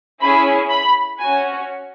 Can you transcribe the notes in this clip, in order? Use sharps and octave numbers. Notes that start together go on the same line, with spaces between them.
C#4 E4 G#4 B5
B5
C#4 F#4 G#5